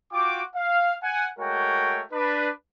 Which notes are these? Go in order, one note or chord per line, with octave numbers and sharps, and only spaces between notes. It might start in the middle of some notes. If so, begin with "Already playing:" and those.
F4 F#4 G5 D6
F5
F#5 G#5
G#3 A3 F#4 A#4 C#5 G5
D4 B4